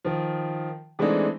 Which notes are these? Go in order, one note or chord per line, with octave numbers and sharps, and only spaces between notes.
D#3 F3
E3 G#3 A3 C4 D4 D#4